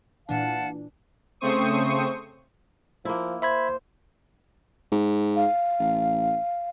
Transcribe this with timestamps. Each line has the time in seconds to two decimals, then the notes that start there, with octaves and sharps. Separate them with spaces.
0.29 A#2 E3 D4 F5 F#5 A5
1.41 C#3 A3 C4 C5 C#6 D#6
3.05 F3 A#3 E4
3.42 C5 E5 B5 G#6
4.92 G#2
5.36 F5
5.79 A1